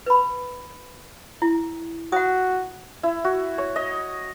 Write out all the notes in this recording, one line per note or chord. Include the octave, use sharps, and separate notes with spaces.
B4 B5
E4
F#4 F#5 D#6
E4
F#4
C#5
D#5